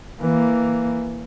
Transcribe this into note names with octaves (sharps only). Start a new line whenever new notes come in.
E3 A#3